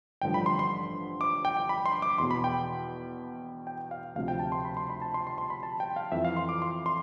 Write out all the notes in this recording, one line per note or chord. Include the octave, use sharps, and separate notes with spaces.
A1 G2 D3 F3 G5
B5
C6
C6
D6
G5
G5
B5
C6
D6
E2 B2 C6
B5
G5
G5
F5
D2 C3 F3 F5
G5
A5
C6
B5
C6
B5
A5
C6
C6
C6
B5
A5
G5
F5
F2 E3 E5
F5
C6
D6
C6
C6